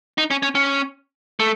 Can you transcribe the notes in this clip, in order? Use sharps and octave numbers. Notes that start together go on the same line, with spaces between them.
D#4
C#4
C#4
C#4
A3